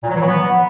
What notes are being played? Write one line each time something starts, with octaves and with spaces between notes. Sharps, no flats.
A#2
F#3
E3
F#3
B3